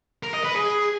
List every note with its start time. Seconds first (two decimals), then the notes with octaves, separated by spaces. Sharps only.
0.23 A#4
0.34 D#5
0.44 B4
0.55 G#4